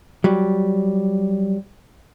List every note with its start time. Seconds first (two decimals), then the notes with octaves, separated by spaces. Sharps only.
0.24 F#3 G3